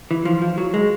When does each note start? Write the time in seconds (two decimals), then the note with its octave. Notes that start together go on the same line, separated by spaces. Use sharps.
0.11 E3
0.25 F3
0.42 F3
0.58 F#3
0.74 G#3